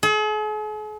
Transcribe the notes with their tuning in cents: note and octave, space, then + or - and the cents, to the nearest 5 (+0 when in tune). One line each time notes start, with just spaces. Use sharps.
G#4 +45